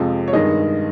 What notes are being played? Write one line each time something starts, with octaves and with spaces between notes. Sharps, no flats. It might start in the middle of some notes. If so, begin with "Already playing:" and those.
Already playing: F2 C3 F3 G#3
C#5
G2 D#3 G#3 D#5